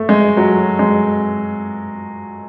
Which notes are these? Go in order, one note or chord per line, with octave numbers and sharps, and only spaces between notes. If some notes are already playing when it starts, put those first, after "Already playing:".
Already playing: A3
G#3
F#3
G#3